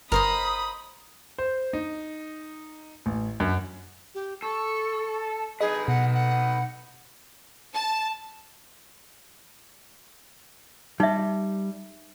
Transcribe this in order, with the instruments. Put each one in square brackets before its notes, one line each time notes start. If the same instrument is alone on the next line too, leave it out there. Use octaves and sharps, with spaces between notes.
[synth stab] G1 [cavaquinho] A#4 C5 D#5 [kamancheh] B5 D#6
[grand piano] C5
D#4
A1
F#2
[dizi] G4
[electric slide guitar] A4 [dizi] C#6
[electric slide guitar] D#4 B4 [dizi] G#4 [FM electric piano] D#5
[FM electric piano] B2 [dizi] F#5
[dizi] F#5
[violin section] A5
[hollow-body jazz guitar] G3 [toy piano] D#4 E5